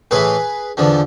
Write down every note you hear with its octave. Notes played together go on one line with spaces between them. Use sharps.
A2 E3 G#4 B4
E2 D3 F3